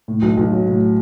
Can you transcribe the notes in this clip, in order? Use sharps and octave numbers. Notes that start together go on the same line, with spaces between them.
A2
B1
B1
F#3
A2